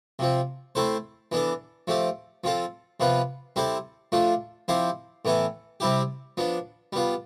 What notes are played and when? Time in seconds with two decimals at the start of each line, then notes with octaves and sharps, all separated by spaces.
0.19 C3 F3 C4
0.75 A3 C4 E4 A4 C5
1.32 E3 B3 D4 A4
1.87 F3 A3 C4 G4
2.44 F3 C4 F4 A4
3.00 C3 F3 B3 F4 B4
3.56 G3 C4 E4 A4 C5
4.12 F3 A3 D4 F4
4.68 F3 C4 E4 G4 C5
5.25 A2 E3 B3 E4 A4
5.80 C3 G3 C4 E4 G4
6.37 F3 B3 D4
6.93 G3 B3 F4